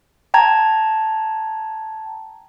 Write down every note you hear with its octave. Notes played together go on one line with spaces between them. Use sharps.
G5 A5 A#5 G#6